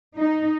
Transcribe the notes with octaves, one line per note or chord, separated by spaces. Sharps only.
D#4